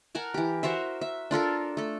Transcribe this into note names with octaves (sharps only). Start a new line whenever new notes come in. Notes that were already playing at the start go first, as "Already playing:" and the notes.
A#4 F#5 G#5 A5
E3 G4
F#4 A#4 C5 E5
E5
D4 F4 A4 A#4
A3 A4